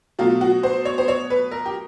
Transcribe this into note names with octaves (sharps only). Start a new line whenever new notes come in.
B2 F#3 A3 F4
F#4
C5
C#5
C5
C#5
B4
A#4
G4